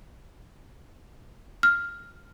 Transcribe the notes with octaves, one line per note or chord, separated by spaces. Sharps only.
F6